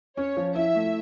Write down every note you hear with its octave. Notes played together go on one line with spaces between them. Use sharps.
C#4 C#5
F3
E4 E5
A3